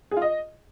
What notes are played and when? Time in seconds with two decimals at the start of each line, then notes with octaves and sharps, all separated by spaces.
0.11 G#4
0.17 F4
0.22 D#5